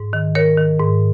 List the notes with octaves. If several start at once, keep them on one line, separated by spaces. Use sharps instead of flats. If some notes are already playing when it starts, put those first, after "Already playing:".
Already playing: G#2
D#3
D#3 A#4 C#5
D#3
G#2